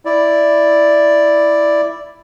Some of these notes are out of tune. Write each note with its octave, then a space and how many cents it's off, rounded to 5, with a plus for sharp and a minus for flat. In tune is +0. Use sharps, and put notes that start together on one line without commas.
E4 +0 D5 +0